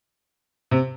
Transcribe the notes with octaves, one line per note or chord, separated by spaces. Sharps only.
C3